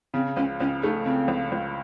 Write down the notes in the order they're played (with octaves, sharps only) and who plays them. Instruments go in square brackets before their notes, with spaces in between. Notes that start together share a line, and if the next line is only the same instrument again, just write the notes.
[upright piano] C#3 [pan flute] C4
[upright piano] C#2 [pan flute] C#4
[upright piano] C#2 [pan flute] C#4
[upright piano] A3 [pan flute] D#4
[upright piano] C#3 [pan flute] C4
[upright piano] C#2
C#2